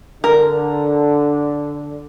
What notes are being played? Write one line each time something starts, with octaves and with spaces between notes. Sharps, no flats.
D3 A#4